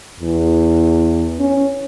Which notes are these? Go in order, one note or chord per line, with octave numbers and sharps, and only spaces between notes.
E2
C#4